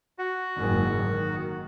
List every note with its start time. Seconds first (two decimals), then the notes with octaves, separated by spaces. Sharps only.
0.19 F#4
0.55 F#1 G#2 D#3
1.08 D#3